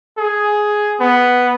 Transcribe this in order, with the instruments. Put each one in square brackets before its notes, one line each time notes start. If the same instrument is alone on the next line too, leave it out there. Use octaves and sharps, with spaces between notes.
[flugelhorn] G#4
B3